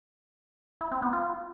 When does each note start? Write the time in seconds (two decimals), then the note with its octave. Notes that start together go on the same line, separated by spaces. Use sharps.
0.81 E4
0.91 C4
1.02 B3
1.13 F4